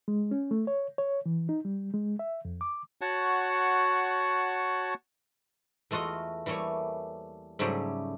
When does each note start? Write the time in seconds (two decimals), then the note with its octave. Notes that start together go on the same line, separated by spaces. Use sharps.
0.08 G#3
0.31 C#4
0.51 A3
0.67 C#5
0.98 C#5
1.26 E3
1.49 D#4
1.65 G3
1.94 G#3
2.19 E5
2.45 F2
2.61 D6
3.01 F#4 C#5 F#5 A5
5.91 E2 A3 F4 F#4 D#5
6.46 E3 G3 A3 A#3 C#5
7.59 G#2 C#3 F#3 G3 A3 G4